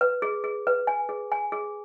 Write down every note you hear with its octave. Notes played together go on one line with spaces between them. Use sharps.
B4
G#4
G#4
B4
G#5
G#4
G#5
G#4